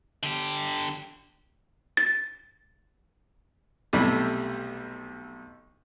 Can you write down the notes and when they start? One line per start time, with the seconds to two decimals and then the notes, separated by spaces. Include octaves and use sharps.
0.23 D3 G4
1.97 A6
3.93 B1 C3 G3 A3 E4